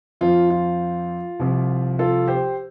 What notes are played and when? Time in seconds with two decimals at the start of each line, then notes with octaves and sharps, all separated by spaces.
0.21 F2 F3 F4
0.50 F4
1.39 C2 C3 F3
1.99 F4 A4
2.28 G4 C5